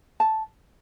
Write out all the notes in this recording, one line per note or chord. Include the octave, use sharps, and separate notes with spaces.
A5